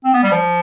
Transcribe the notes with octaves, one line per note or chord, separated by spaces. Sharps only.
C4
B3
G3
F3